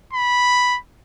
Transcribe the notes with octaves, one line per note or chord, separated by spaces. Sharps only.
B5